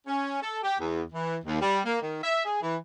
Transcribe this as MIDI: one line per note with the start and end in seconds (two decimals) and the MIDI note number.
0.07 0.38 61
0.42 0.59 69
0.63 0.74 67
0.79 1.01 40
1.13 1.37 52
1.45 1.61 39
1.61 1.79 55
1.85 1.97 58
2.02 2.21 51
2.23 2.40 76
2.45 2.61 68
2.62 2.76 52